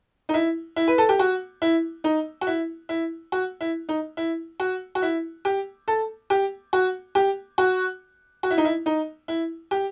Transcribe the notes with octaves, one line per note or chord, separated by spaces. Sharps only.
D#4
E4
E4
B4
A4
G4
F#4
E4
D#4
F#4
E4
E4
F#4
E4
D#4
E4
F#4
F#4
E4
G4
A4
G4
F#4
G4
F#4
F#4
E4
D#4
E4
D#4
E4
G4